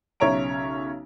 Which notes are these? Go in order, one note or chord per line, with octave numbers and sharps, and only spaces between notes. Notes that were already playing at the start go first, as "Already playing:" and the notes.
B1 C#3 C#5 E5 A#5 D7